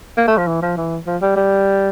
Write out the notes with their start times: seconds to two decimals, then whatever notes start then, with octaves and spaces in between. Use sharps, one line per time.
0.17 A#3
0.27 A3
0.38 F3
0.48 E3
0.62 F3
0.77 E3
1.06 F3
1.22 G3
1.36 G3